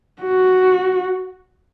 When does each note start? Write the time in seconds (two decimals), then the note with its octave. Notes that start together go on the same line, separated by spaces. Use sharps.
0.22 F#4